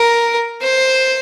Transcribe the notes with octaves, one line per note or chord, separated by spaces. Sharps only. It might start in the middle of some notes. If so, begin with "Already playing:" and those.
Already playing: A#4
C5